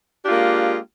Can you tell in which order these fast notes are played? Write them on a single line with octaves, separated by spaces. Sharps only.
D4 G4 F4 A#3 G#3